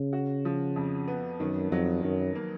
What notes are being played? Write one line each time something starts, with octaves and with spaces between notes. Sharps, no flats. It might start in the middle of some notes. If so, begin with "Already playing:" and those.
Already playing: C#3
F#4
F3
F2
B3
F#2 D#3
F2 F#3
F#2 D#3
A#3